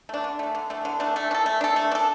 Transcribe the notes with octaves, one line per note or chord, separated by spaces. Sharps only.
A3 D4
D3
A3 D4
D3
A3 D4
D3
A3 D4
A3
D4
A4
A3
D4 A4
A3
D4 A4